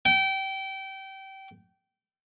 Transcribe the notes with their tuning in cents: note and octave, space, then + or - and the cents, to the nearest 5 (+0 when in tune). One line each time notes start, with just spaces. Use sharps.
G5 -25